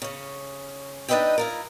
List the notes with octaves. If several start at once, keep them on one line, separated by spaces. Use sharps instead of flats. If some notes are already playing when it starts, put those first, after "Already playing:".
C#3 C#4
D4 D#4 B4 D#5 E5 G5
E4 F4 A#4